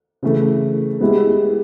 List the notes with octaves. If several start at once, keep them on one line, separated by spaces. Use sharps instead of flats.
C#3 E3 A3
G#3 B3 E4 G4